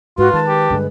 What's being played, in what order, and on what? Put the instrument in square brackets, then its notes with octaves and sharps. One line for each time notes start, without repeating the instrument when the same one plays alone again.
[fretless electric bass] G#2 [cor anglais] F4 [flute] F#4 [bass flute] B4
[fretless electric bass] D#3 G#3 [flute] A5
[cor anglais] G4
[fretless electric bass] G2 D3 G#3